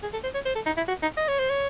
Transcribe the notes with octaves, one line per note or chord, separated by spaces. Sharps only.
G#4
A4
C5
C#5
C5
A4
D#4
E4
F#4
D#4
D#5
C#5
C5
C#5